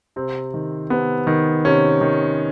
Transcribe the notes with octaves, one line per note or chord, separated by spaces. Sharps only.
C3 C4
D#3
C3 B3
D#3
C3 C#4
D#3